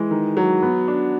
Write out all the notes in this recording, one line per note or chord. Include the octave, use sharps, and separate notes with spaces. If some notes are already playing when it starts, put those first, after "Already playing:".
Already playing: E3 G#3
D#3
F#3
B3
D4